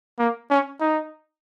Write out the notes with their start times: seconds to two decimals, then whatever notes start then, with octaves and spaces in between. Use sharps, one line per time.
0.19 A#3
0.50 C#4
0.81 D#4